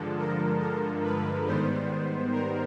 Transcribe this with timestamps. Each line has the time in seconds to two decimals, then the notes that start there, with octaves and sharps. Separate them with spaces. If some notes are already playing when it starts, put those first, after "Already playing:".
Already playing: G2 D3 F3 G#3 A4
0.18 A#4
0.61 A#4
1.03 B4
1.46 G#2 D#3 G3 B3 C5
2.32 A#4